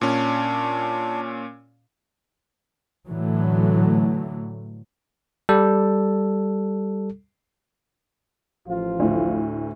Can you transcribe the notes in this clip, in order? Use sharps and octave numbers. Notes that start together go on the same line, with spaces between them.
A#2 C#4 D4
A2 D3 E3 F#3 A3
G3 A4
A1 F3 F4
D2 A2